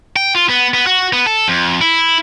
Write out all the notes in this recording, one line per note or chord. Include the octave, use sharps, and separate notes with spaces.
G5
F4
B3
B3
F#4
B3
A4
F2
E4